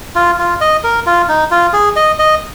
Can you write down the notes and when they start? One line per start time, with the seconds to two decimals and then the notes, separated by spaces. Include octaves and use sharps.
0.15 F4
0.39 F4
0.61 D#5
0.84 A#4
1.06 F4
1.29 D#4
1.51 F4
1.73 G#4
1.96 D#5
2.19 D#5